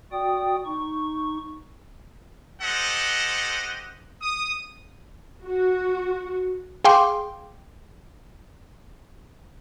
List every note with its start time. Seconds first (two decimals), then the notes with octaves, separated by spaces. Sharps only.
0.12 F#4 D5 G5 D#6
0.65 D#4 C#6
2.62 G4 A4 C5 D#5 F#5
4.22 D#6
5.45 F#4
6.85 G#4 F5 G5 C6 D6